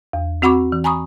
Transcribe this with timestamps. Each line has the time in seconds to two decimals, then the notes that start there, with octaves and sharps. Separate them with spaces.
0.13 E2
0.42 C4 F#4 F#5 B5 C#6 D6
0.72 E3
0.84 G#5 A#5 B5 C#6 D#6